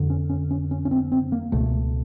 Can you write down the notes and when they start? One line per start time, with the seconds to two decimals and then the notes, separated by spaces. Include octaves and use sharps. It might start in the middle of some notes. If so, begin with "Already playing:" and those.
Already playing: F2 D3
0.10 C#4
0.29 C#4
0.51 C#4
0.71 C#4
0.85 C#4
0.91 C4
1.12 C4
1.32 A#3
1.52 C#2 B2 A3